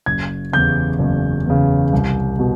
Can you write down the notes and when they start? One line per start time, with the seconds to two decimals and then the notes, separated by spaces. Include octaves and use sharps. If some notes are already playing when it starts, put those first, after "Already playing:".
0.06 F#1 G#6
0.52 E2 C#3 G6
0.99 F#1
1.46 E2 C#3
1.93 C2
2.39 B2